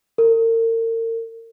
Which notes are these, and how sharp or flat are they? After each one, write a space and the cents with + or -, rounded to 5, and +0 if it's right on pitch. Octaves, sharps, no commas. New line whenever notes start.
A#4 -40